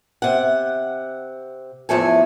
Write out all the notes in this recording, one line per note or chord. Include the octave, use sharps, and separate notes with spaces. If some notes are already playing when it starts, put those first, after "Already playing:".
C3 F#5
E2 A2 F3 A3 A4 G#5